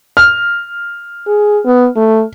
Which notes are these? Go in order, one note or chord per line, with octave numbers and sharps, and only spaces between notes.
F6
G#4
B3
A3